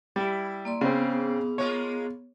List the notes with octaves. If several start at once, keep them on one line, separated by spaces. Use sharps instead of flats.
G3 E4
A#3 D5 C6
G#2 C#3 B3 C4
G#3 A#3 F4 C#5